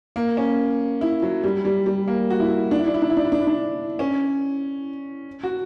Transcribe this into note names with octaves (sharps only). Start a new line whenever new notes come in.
A#3
C#4
E4
F#3
G3
G3
G3
A#3
F#4
E4
D4
E4
D4
E4
D4
E4
D4
E4
D4
E4
D4
C#4
F#4